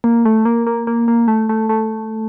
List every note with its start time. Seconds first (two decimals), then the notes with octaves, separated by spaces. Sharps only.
0.04 A#3
0.25 A3
0.45 A#3
0.67 A#3
0.87 A#3
1.08 A#3
1.28 A3
1.49 A3
1.69 A3